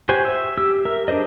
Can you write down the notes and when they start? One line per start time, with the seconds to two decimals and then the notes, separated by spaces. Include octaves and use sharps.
0.09 F#4 G4 C5 G#5
0.25 E5
0.58 G4 E6
0.85 A#4 E5
1.08 D4 G4 G#4 C5 D#5